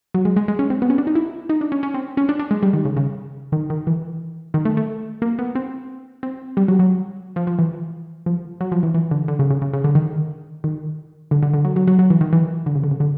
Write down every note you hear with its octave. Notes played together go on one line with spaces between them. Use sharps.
F#3
G#3
G#3
G#3
C#4
C4
B3
C#4
D4
D#4
E4
D#4
D4
C#4
C#4
C4
C#4
D4
D4
G#3
G3
D#3
C#3
C#3
D#3
D#3
E3
D#3
A3
A3
A#3
B3
C4
C4
G3
F#3
F#3
F3
F3
E3
F3
F#3
F3
E3
E3
D3
D3
C#3
C#3
C#3
C#3
D3
D#3
D#3
D3
D3
D3
F#3
F#3
F#3
F#3
E3
D#3
E3
D3
C#3
D3
C#3
D3